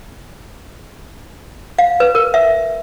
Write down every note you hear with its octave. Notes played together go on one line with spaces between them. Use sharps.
F5
B4
A#4
E5